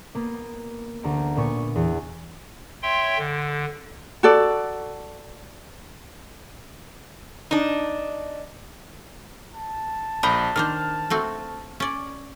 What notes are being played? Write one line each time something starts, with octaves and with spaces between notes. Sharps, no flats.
A#3 B3
D2 A#5 D7
A#2 B3 C#6
E2
C#5 E5 G5 C6
D3
F#4 A4 D5
D4 D#4
A5
A#1 A#4 D#5 G5 B5
D#3 D4 C5 F6
A3 C4 F#4
C#4 D5